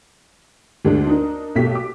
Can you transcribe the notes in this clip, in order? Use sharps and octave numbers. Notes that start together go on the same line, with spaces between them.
D2 G#3 D4
D4 D#4 A#4
B1 A3 G4 B6
D6